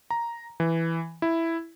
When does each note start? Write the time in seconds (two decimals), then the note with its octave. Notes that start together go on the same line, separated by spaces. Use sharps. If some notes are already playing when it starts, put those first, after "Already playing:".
0.10 A#5
0.60 E3
1.22 E4